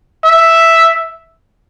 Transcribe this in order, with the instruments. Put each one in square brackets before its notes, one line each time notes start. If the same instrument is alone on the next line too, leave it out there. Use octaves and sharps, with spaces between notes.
[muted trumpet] E5